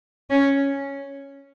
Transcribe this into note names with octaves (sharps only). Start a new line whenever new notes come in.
C#4